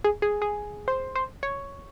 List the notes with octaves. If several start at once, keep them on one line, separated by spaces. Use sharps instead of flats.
G#4
G#4
G#4
C5
C5
C#5